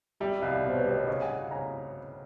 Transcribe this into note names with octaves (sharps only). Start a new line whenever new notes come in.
G3 D5 E5
D5 E5
C2 D#5 F5
D5 E5
B2 C5
B4 C#5
G3 B4 C#5
C#5 D#5
C#3 C#5 D#5
F#5 G#5
C#3
C#3 G#5 A#5